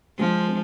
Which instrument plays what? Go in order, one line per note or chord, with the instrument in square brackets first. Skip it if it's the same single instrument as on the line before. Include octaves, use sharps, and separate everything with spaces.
[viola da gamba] F3 [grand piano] G#3
[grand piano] C4